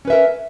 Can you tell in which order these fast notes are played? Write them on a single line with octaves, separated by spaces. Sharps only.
C#4 B4 E5 A#4